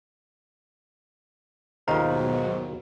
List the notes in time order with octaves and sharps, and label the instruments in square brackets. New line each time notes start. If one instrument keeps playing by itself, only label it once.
[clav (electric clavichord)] D#2 D#3 F5 [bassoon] G#2 [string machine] B2 F#3 [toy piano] F4 A#5